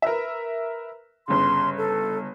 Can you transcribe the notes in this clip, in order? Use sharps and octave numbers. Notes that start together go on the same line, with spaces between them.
A#4 B4 E5
G1 C#3 C6
A4